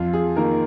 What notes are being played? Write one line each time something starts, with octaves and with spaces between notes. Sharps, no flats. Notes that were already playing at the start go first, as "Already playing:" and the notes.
Already playing: F2 F4
G#4
D#3 A#3 A#4